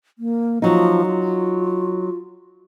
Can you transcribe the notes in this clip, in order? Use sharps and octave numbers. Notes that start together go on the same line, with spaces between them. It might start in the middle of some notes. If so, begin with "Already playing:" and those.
A#3
F3 F#3 D#4
F4